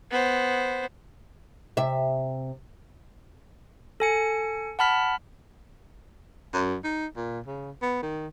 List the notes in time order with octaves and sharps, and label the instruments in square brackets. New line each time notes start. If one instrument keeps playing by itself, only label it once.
[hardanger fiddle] B3 C5
[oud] C3 E5
[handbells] A4 G#5 C#7
F#5 A5 B5 F6 B6
[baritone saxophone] F#2
D#4
A#2
C#3
B3
D#3